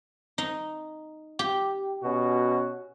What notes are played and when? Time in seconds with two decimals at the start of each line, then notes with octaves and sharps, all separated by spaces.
0.38 D#4
1.39 G4
2.03 B2 C#4 F#4